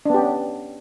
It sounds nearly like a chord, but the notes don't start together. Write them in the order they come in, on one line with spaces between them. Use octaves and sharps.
D4 B3 G4 C#4